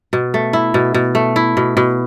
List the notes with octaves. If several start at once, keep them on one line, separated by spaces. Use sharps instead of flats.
B2
A3
E4
B2
B2
A3
E4
B2
B2